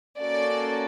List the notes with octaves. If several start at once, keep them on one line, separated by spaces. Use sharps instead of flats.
A#3 C#4 F#4 A4 D5